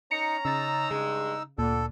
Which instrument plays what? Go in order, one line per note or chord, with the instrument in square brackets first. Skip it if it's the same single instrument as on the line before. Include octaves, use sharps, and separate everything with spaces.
[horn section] C#4 A#5 [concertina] D#4 [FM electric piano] C#7
[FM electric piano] C#3 A6 [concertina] D#4 E6
[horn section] G2 G#3 [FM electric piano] C#3
[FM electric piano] D2 A#2 [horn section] D3 [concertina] A4